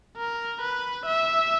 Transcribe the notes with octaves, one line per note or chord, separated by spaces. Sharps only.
A#4
B4
E5